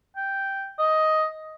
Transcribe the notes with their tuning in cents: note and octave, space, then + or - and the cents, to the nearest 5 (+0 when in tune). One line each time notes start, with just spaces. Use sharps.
G5 -5
D#5 +10